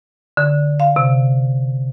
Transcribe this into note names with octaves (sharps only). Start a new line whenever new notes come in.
D3
F5
C3